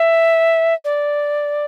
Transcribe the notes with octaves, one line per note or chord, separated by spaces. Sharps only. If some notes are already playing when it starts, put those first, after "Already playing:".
Already playing: E5
D5